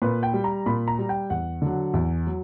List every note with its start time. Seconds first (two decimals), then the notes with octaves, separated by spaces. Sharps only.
0.02 A#2 B4
0.23 G5
0.34 G3
0.44 A#5
0.66 A#2 B5
0.88 A#5
0.99 G3
1.09 G5
1.30 E2 F#5
1.62 D3 F#3
1.94 E2
2.27 F#3